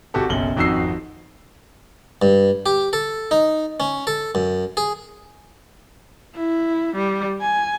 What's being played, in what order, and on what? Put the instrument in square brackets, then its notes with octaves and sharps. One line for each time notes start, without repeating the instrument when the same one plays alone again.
[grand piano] G#1 F#4 G4 A4
F#1 B1 F#7 G7
G#1 F2 D#4 F#4 E6 C7
[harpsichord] G2
G4
A4
D#4
C#4
A4
F#2
G#4
[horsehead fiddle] E4
G3
G#5